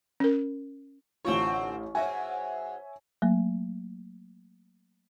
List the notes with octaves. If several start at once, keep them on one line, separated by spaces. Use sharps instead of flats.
C#4 A#4
A1 D3 C4 F4 C#5 C#6
G#2 F#4 C#5 E5 G#5
F#3 A3 A#3